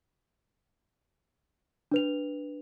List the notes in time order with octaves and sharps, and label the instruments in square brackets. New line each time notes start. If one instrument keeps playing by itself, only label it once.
[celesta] D4 B4 F7